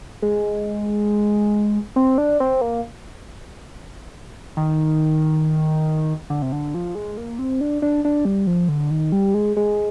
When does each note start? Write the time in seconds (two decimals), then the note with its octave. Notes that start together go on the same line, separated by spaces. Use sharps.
0.22 G#3
1.96 C4
2.18 D4
2.40 C4
2.61 A#3
4.57 D#3
6.30 D3
6.42 C3
6.52 D3
6.74 F3
6.95 G#3
7.17 A#3
7.39 C4
7.61 D4
7.82 D4
8.05 D4
8.25 G3
8.47 F3
8.69 D3
8.90 D#3
9.12 G3
9.34 G#3
9.57 G#3